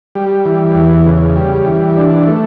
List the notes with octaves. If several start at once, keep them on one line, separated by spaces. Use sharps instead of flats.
G3
E3
E2
C#3
G3
E3
D4
A3